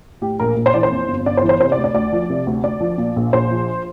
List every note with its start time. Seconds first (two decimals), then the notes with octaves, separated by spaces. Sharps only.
0.22 A2 G4
0.40 A#1 A#4
0.56 A#1
0.66 C5
0.74 E3 D5
0.83 C5
0.91 F2
1.08 G1
1.26 G1 D5
1.37 C5
1.42 E3
1.49 C5
1.60 C3 C5
1.72 D5
1.78 D2
1.84 D5
1.94 D2 D5
2.13 F3
2.30 C3
2.47 D2
2.64 D2 D5
2.80 F3
2.98 A#2
3.16 A#1
3.33 A#1 C5
3.51 F3